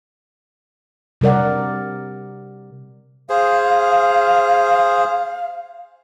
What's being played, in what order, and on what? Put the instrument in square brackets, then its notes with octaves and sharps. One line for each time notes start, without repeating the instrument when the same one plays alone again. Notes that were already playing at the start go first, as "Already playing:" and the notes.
[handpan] C3 G3 A#4 D5 F#5
[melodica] G#4 C5 [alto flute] F5